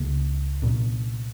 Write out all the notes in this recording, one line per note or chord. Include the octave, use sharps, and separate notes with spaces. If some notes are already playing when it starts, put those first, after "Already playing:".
Already playing: C#2 C#3 A#3
C2 A#2